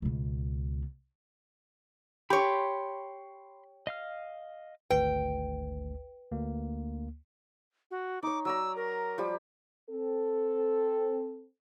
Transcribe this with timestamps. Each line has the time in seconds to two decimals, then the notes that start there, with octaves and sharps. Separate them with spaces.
0.02 C#2 B2
2.30 G4 C#5 B5 C6
3.87 D#5 F5 F6
4.90 G#1 D2 B4 G5
6.31 D2 A#3
7.91 F#4
8.23 D#4 C#5 D6
8.45 F#3 D5 A#5 E6
8.76 A#4
9.18 F3 G3 G4
9.90 C4 A4